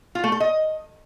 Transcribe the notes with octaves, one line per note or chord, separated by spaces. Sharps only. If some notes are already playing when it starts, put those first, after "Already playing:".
F4
A3
A4
D#5